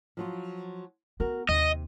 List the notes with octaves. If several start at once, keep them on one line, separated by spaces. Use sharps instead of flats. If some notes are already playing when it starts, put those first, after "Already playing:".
F3 F#3 F4
B3 F#4 A#4
D#2 C3 D#5